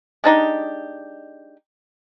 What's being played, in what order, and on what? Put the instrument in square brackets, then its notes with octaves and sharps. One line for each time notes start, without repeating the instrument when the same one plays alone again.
[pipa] G#3 D4 D#4 G4